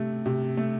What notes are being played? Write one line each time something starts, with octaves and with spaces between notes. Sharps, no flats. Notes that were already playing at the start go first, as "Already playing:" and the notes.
Already playing: C3 A3
C3
A3